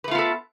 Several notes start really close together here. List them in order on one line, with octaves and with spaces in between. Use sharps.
B4 A3 F4 B3 A4